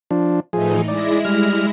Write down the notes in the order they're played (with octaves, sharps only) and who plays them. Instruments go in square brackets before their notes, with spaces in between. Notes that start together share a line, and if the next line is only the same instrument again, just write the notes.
[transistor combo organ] F3 D4
[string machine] A2 E3 D#4 [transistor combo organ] F3 G#4
[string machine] G#3 E4 A#6 [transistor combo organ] D5
[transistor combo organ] G3 F6